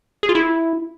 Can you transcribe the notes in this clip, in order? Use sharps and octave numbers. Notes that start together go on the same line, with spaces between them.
G#4
F4
E4